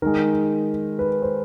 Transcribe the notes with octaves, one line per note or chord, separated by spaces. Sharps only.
D#3 G#3 A#4
B4
C5